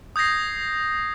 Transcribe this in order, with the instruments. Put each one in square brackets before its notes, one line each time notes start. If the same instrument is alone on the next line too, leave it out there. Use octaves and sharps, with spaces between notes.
[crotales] D#6 G6 G#6 A#6 C7